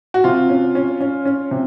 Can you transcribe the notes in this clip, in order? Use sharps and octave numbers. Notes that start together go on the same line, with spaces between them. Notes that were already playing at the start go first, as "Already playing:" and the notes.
F#4
C3 F4
C#4
C#4
C#4
C#4
C3